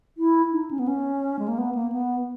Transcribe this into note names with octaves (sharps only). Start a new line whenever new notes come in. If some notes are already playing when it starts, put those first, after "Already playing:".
E4
D#4
C#4
B3
C#4
G#3
A#3
B3
A#3
B3